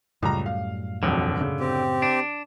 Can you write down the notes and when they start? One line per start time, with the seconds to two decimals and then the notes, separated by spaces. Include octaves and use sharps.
0.23 C#2 F#2 A2 G3 A#5
0.46 F5
1.03 E1 B1 F2 D3
1.40 C#3
1.60 C4 G4
2.02 D4